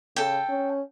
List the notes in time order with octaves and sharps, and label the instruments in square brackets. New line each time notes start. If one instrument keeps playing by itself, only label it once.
[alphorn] C#3 [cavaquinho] A4 G5
[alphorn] C#4